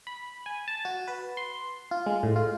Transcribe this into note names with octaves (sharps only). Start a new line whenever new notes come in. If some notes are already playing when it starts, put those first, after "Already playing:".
B5
G#5
A5
F#4
B4
C6
F4
G#3
A2
F4